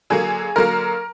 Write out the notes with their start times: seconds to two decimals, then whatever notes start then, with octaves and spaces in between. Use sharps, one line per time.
0.10 D3 F#3 A#3 G#4
0.56 D3 F#3 A#3 A#4